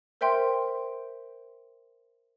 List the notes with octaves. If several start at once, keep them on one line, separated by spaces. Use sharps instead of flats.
A#4 C5 E5 G5 C6